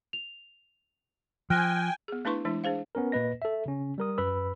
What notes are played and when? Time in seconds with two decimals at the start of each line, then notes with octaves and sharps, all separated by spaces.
0.13 F7
1.50 F3 G5 G#5 F6 F#6 A#6
2.08 B3 G#4
2.25 A3 D4 E4 B4 C6 C#6
2.45 E3 G#3 D4 E4
2.64 D4 G#4 C5 F5
2.95 B3 C#4 A#4
3.12 A#2 A#3 B4 D#5 A#6
3.42 A4 E5
3.66 C#3 C#4
3.98 G3 A#4 D#6
4.18 F#2 B4 B5 E6